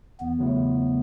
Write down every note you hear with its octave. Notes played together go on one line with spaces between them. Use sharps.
E2 B3
C#3 F#3 A3 E4